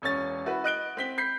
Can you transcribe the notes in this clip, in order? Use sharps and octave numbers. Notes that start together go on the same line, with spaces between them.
E1 C#4 C#5 A6
E4 F#4 B4
D#5 F#6 D7 G7
C4 B6 G7
B5 G6 B6 C7